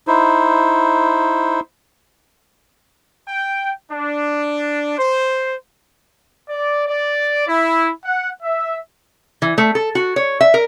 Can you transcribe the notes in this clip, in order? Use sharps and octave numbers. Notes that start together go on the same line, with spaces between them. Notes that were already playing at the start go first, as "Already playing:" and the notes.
D#4 E4 C5
G5
D4
C5
D5
D5
E4
F#5
E5
E3
A3
A4
F#4
C#5
E5
A#4